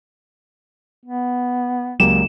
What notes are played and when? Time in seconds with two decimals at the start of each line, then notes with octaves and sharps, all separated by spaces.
1.06 B3
2.00 C#2 F#3 G#3 A#3 G4 E7